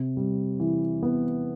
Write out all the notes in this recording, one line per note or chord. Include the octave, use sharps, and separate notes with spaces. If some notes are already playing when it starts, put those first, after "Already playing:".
Already playing: C3
G3
E3
B3